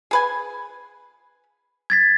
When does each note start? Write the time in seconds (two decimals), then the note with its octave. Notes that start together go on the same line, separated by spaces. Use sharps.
0.11 G#4 B4 G#5
1.90 G#6 A6 B6